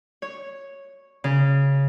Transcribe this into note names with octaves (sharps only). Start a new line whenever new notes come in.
C#5
C#3